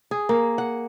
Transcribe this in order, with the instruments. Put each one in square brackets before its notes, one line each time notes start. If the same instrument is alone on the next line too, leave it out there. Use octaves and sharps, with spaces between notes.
[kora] G#4
A#3
F#5